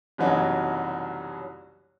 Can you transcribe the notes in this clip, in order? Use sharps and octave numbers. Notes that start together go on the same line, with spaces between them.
F#1 C2 E3 F#3 D#4